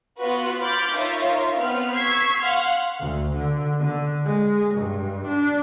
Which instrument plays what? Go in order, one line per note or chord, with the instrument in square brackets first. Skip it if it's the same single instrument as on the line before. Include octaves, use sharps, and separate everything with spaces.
[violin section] B3 F4 F#4 B4
B5 C6 D6 F6 G6 A6
D#4 F4 A#4 C#5 E5 F5
B3 C4 F4 F6
C#6 E6 G#6 B6 C7
F5 F#5 C6 F6
[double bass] D2
D3
D3
G#3
G2
D4